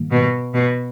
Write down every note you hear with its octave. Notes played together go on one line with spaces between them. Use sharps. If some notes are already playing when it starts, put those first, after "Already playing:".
Already playing: G#2 D#3 G3 A#3
B2
B2